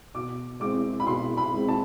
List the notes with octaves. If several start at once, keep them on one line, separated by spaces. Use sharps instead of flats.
B2 D6
G#3 C4 D6
B5
B2 C6
B5
G#3 C4
A5